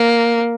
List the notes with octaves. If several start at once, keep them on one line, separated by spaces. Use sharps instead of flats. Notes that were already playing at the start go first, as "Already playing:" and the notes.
Already playing: A#3